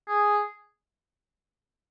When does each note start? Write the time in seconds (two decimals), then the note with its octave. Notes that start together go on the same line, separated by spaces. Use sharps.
0.08 G#4